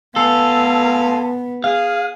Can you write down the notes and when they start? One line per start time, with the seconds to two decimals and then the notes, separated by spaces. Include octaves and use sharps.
0.16 B3 A4 F5 G#5 C6
1.64 G#4 F5